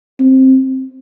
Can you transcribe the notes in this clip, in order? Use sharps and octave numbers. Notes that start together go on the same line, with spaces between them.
C4